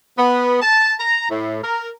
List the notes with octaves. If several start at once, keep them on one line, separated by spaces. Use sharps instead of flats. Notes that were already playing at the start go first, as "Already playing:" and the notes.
B3
A5
A#5
A2
A#4